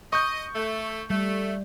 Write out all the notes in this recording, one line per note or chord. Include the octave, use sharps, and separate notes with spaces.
D#5 C#6 G6
A3
G3 A3